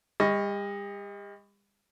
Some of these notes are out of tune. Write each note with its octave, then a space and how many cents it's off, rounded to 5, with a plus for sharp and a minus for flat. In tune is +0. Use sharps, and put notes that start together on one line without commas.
G3 +40 D#5 +10 C#6 +0